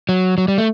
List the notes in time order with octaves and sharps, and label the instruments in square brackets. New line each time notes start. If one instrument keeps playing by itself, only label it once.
[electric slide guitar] F#3
F#3
G3
A3